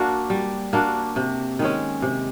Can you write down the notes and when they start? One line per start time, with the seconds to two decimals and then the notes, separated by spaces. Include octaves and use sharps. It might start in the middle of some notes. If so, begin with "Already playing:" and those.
Already playing: A#3 D4 F#4
0.30 G3
0.73 A#3 D4 F#4
1.16 C3
1.59 D#3 G#3 C#4
2.02 C3